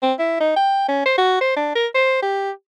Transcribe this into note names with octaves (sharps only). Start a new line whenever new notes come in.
C4
E4
D#4
G5
C#4
C5
F#4
C5
D4
A#4
C5
G4